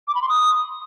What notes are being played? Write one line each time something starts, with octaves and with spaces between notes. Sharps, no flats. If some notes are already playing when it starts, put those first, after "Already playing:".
D6
B5
C6
D#6